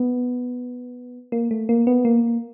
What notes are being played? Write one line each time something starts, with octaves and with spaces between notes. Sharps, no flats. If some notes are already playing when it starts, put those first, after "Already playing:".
Already playing: B3
A#3
A3
A#3
B3
A#3